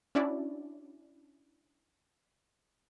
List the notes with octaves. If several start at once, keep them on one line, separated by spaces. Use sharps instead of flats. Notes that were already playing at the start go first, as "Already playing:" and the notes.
C#4 D4 E4 F#4 D5